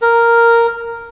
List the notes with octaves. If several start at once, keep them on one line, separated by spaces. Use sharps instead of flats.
A#4